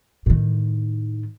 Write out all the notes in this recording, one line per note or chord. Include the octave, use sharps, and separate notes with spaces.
A2 D#3